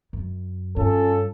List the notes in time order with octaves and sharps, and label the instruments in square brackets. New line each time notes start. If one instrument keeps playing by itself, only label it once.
[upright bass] F#2
[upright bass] G2 [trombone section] C#4 F4 A4